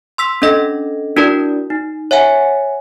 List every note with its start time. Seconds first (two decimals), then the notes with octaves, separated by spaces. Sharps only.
0.18 C6 E6 B6
0.42 C#4 D4 A4 D#5 A#6
1.17 D4 E4 F#4 A#4 D5
1.70 D#4
2.11 C#5 E5 F#5 G#5